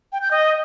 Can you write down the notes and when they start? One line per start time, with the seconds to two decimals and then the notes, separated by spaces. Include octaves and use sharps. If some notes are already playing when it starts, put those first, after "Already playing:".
0.12 G5
0.22 G6
0.31 D#5